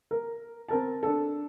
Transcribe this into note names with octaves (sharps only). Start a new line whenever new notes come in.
A#4
C4 A#4 A5
D4 A4